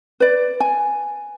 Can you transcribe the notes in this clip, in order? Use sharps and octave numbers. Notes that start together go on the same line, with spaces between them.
B4 D5
G#5